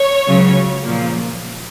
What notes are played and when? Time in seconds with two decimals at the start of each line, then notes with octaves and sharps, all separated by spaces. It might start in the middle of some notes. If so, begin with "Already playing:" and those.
Already playing: C#5
0.27 C#2 C#3 F#3
0.83 A#2 F3 A#3